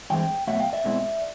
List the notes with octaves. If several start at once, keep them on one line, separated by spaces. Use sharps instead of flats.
G2 E3 G#3 C4 G5
B2 F#3 A3 E5 F#5
F5 G5
D5 E5
B2 G#3 C4 E4